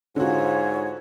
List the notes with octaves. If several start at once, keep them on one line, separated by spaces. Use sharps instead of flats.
G#2 D3 F4 F#4 C#5